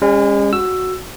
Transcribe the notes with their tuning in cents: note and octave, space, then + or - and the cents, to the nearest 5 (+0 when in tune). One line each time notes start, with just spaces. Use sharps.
G#3 -40 C#4 +0
F#4 +0 E6 +10